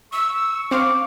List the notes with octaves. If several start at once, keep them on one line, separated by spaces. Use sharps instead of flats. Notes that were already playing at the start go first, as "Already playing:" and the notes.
C#6 E6
C4 F5 D6